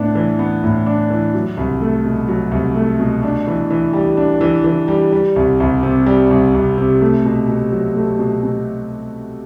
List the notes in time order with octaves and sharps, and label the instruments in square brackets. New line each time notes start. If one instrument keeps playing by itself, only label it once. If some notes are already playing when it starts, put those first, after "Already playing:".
Already playing: [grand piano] A2 B3 D4
E3
B3
A2
D4
E3
F#3
C2
A3
B2
F#3
C2
A3
B2
D4
E3
E3
G3
D4
E3
E3
G3
G3
C2
C2
C3
G3
C2
C2
C3
A3
B2
B2
F#3
A3
B2
B2